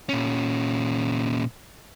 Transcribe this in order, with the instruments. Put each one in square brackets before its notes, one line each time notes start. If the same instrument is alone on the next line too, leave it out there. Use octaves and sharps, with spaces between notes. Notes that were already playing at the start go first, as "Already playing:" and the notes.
[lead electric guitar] A#2 C#4